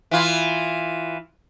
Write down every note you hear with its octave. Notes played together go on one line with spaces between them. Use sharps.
E3 F4